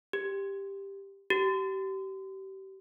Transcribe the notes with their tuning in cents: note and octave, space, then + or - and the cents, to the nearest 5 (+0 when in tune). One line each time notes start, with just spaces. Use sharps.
G4 +10
G4 -30